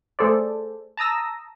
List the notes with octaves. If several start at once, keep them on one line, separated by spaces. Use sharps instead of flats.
A3 G#4 A4 C5 D5
A5 A#5 D#6 E6 A#6